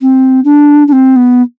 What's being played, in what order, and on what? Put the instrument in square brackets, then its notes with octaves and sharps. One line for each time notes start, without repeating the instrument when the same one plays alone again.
[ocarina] C4
D4
D4
C4
B3